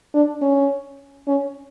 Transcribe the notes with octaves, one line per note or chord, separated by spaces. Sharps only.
D4
C#4
C#4